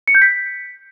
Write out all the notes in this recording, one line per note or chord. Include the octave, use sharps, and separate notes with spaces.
C#7
G6
B6